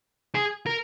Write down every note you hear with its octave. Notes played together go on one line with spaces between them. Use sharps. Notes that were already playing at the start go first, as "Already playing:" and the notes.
G#4
A#4